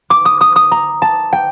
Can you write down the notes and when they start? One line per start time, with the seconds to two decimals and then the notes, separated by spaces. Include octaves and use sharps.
0.10 D6
0.25 D#6
0.41 D#6
0.56 D#6
0.71 A#5
1.02 A5
1.33 G5